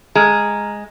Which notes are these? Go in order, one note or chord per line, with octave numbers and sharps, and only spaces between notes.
G#3 A#5 F6